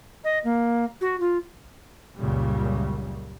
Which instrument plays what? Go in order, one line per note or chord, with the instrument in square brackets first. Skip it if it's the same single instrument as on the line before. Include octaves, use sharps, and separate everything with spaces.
[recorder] D#5
A#3
F#4
F4
[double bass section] C#2 F#2 A#2 C#3 G3